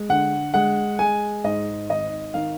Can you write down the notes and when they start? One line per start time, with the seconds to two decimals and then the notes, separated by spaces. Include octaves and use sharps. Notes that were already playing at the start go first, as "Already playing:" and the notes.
Already playing: G#3
0.09 D3 F#5
0.54 G#3 F#5
0.99 G#3 G#5
1.44 G#2 D#5
1.90 G#1 D#5
2.34 D#3 F5